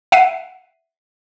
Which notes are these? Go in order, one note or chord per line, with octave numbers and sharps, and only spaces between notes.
E5 F#5 C7 D#7